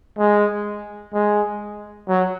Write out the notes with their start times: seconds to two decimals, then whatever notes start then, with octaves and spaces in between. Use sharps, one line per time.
0.18 G#3
1.13 G#3
2.08 F#3